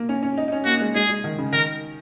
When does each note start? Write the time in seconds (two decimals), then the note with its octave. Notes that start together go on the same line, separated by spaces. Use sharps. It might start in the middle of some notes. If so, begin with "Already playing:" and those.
Already playing: A#3
0.09 C#4
0.23 C#4
0.37 D#4
0.48 D#4
0.52 C#4
0.65 A#3 F#4
0.80 G#3
0.95 G#3 G#4
1.09 G#3
1.24 D#3
1.38 C#3
1.53 D#3 A#4